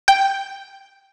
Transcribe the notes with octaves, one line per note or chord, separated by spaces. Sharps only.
G5